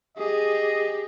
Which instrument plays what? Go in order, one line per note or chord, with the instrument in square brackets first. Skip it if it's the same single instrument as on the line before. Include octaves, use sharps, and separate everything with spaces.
[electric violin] G4 G#4 [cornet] D#5